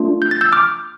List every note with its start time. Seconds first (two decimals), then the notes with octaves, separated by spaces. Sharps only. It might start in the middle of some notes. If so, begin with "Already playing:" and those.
Already playing: A3 D4 F4
0.22 G6
0.31 A6
0.41 E6 G6
0.52 D6 F6